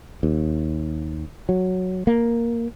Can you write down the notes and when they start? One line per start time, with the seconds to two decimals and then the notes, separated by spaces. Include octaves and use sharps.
0.23 D#2
1.49 F#3
2.07 A#3